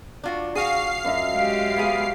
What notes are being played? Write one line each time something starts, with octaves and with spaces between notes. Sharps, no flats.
D4 F4 F#4
F#4 G#4 F5 C#6 C7
F#2 D#5 E5
G#3 G4
B3 G#4